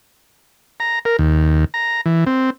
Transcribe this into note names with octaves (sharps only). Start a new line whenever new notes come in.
A#5
A#4
D#2
A#5
E3
C4